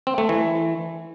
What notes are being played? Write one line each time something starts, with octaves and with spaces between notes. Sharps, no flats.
C4
A3
E3